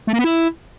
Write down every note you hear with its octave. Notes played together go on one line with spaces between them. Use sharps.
A3
A#3
B3
E4